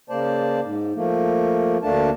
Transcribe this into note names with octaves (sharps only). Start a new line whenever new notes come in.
C#3 A#3 C5 D5 A5
G#2
F3 A3 A#3
D2 A3 A#3 D4 A5